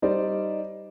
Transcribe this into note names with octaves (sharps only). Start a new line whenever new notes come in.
G3 D#4 C5 D5